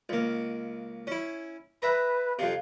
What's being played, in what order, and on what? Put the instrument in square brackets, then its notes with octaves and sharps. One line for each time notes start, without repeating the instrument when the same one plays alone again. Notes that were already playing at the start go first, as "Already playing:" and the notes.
[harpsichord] C#2 A#3
C#4 E4
[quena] B4 [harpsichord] E5 A#5
[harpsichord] F2 C3 [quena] F5